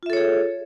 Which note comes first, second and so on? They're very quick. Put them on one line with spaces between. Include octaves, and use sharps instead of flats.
F4 E5 A4 C#5 G#4